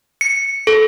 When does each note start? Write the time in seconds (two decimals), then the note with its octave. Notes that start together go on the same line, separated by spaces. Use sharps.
0.21 C#7
0.67 A4